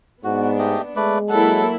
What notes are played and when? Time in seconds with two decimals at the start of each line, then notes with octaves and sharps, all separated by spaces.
0.24 G#2 B3 D4 F#4
0.59 A3 G4 D#5
0.96 G#3 A3 B4 D5
1.30 F#3 A#3 E4 A4 F#5